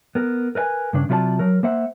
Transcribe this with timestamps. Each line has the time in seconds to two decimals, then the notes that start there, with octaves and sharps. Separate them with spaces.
0.15 B3 A#4
0.55 A#4 B4 D5 G#5
0.93 G2 C#3 D4
1.09 C3 F#3 F4 B4 D5 A5
1.39 F#3 A#4
1.63 A#3 C5 E5 F#5